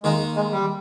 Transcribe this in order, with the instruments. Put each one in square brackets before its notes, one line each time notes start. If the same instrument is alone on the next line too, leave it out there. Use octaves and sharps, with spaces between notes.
[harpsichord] D#3 A#3 D#4 [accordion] G#3
[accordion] G#3
G3